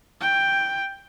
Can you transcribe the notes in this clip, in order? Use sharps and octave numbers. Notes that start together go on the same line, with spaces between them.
G5